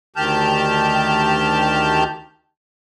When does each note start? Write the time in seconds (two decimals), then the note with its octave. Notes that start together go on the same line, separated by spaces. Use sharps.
0.16 D2 D#3 G4 A5 F6 G6